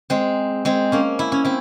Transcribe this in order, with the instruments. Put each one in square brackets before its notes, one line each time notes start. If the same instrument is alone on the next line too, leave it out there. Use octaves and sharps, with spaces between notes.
[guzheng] G#3 C4
G#3 C4
A#3 C#4
E4
C#4
C4 E4